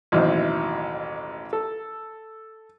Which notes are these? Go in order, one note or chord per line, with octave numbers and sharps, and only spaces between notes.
A1 D#2 B2 F#3 E4 C5
A4